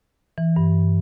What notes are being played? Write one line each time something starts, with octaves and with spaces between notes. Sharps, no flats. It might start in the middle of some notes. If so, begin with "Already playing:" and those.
E3
G2